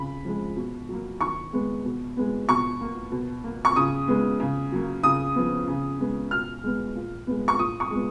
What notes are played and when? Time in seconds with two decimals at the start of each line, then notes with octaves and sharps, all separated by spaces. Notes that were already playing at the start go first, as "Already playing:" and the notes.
Already playing: C#3 B5
0.25 F3 G#3
0.57 B2
0.89 F#3 A#3
1.21 D#3 C#6
1.53 G#3 B3
1.85 B2
2.17 G#3 B3
2.49 B2 C#6
2.81 A#3
3.12 B2
3.44 A#3
3.65 C#6
3.76 C#3 D#6
4.08 G#3 B3
4.40 C#3
4.72 F#3 A#3
5.03 C#3 D#6
5.35 F3 B3
5.68 C#3
6.00 G#3 B3
6.31 B2 F6
6.64 G#3 B3
6.95 A#2
7.27 G#3 B3
7.48 C#6
7.59 A#2 D#6
7.80 C#6
7.91 G#3 B3